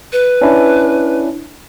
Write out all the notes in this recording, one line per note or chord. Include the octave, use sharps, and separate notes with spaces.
B4
C#4 D4 E4